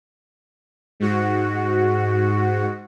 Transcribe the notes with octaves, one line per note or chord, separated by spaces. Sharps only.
G#2 F#4